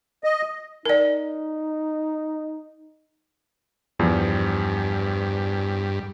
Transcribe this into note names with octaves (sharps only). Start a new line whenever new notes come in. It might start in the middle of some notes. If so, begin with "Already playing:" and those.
D#5
D#4 A#4 D5
E2 G2 F3